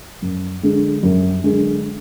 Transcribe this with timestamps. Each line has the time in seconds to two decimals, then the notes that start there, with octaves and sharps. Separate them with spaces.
0.22 F#2
0.63 D3 G#3
1.03 F#2
1.44 D3 G#3